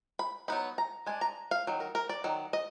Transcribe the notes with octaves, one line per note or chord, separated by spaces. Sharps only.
B5
F#3 B3 D#4 B5
A#5
G#3 D4 G#5
A#5
F5
D#3 F#3
A#4
A#4
D5
D#3 F#3
D#5